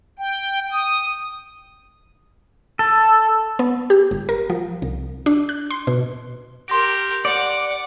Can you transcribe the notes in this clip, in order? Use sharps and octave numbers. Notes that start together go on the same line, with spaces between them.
G5
D#6
A4
B3
G4
G1
A#4
F3
C2
D4
F#6
C6
B2
G4 A#4 C6 A#6 D7
D5 F#5 D6